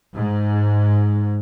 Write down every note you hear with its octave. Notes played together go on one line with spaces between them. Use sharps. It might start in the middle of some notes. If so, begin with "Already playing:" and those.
G#2